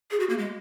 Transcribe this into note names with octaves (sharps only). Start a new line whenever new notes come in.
G#4
F#4
A#3
G#3